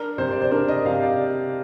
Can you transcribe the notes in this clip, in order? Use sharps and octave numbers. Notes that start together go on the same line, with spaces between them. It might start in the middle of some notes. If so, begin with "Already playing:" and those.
Already playing: D4 A#4
C3 C5
D5
C5
D4 A#4
D#5
C3 F5
D5